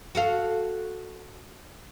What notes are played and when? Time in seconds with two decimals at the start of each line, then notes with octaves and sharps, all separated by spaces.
0.15 F#4 A4 F5